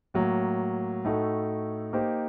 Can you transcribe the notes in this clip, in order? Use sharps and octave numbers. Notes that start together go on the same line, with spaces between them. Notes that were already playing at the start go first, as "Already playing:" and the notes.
A2 F#3 A#3
A2 A3 D#4 F#4 A4
A#3 D#4 G4 C5